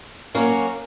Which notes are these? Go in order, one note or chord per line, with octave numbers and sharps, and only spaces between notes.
F#3 A#3 C#4 F#4